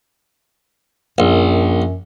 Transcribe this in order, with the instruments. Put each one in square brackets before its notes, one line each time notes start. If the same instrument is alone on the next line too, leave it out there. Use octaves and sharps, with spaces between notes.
[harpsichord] A#1 [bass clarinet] F#2